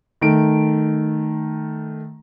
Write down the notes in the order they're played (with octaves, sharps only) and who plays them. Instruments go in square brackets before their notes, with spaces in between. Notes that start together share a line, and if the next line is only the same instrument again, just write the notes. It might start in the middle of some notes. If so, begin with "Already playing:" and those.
[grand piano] D#3 A3 D7